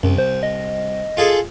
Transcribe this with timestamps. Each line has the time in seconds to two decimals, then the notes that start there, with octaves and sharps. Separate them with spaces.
0.03 C2 F#2
0.18 C5
0.43 D#5
1.17 F4 G#4 A4